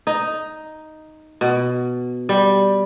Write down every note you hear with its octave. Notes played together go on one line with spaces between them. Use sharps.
D#4
B2
G3